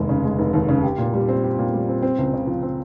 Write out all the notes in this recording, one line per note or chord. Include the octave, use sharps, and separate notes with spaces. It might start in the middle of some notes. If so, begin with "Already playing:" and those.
Already playing: F1 D#2 G#3
C#3
G#3
F1
D#2
C#3
G4
A#2
G3
C4
G4
A#2
G3
C4
C4
C#2
C#3
F3
C4